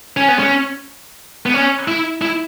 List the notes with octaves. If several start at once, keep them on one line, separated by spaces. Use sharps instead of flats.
C#4
B3
C#4
B3
C#4
E4
E4